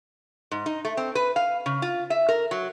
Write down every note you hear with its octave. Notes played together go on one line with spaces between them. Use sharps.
G#2
D#4
A3
C4
B4
F5
C#3
F4
E5
A#4
F#3